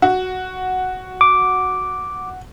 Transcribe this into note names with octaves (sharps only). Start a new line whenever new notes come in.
F#4
D6